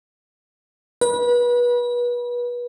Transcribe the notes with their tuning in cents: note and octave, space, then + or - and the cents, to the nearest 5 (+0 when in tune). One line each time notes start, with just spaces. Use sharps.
B4 -30